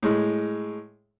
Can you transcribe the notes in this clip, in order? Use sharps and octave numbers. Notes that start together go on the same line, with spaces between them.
A2 G#3